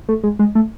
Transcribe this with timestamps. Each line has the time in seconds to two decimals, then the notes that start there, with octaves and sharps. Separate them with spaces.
0.09 A3
0.23 G#3
0.39 G#3
0.55 A3